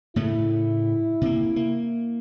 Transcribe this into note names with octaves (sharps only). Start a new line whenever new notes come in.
A2 C#3 A3 E4
C3 A#3
A#3